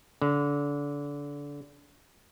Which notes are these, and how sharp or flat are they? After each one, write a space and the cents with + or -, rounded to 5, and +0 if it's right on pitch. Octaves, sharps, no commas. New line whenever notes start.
D3 -25